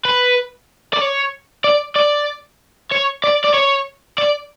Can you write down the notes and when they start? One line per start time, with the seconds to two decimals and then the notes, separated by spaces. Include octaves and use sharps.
0.05 B4
0.93 D5
1.01 C#5
1.64 D5
1.96 D5
2.91 C#5
3.24 D5
3.45 D5
3.54 C#5
4.18 D5